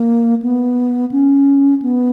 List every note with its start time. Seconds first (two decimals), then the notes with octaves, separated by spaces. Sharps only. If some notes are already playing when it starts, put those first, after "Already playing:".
Already playing: A#3
0.42 B3
1.12 C#4
1.82 B3